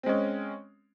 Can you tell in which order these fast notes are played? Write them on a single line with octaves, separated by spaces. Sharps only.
C4 G#3 C#4